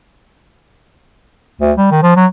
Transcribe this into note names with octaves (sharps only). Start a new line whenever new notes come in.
D2
G3
D#3
F3
F#3